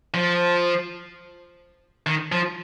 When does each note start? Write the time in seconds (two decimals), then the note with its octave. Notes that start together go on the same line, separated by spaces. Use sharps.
0.14 F3
2.07 D#3
2.32 F3